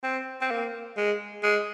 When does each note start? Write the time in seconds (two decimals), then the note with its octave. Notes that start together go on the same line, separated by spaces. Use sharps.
0.04 C4
0.41 C4
0.51 A#3
0.97 G#3
1.43 G#3